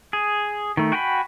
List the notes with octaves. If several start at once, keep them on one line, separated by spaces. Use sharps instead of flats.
G#4
D#3 A3
F#4 G5 G#5 A#5 B5